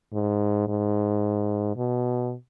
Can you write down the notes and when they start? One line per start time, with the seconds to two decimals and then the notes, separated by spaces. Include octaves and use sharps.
0.13 G#2
0.68 G#2
1.77 B2